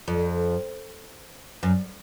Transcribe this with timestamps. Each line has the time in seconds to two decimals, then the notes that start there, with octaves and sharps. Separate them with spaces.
0.08 F2
1.63 F#2